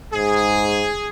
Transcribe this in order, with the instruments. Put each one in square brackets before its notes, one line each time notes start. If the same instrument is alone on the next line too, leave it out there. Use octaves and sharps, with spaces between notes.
[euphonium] G#2 [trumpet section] G#4